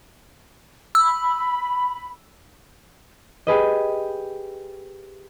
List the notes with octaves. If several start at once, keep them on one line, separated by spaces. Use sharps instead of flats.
B5 E6
G4 G#4 B4 D#5